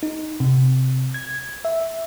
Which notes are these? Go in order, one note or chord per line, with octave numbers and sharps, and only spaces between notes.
D#4
C3
G#6
E5